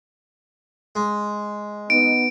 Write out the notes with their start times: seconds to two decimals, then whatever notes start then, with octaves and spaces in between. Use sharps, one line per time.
0.95 G#3
1.90 B3 D#4 D7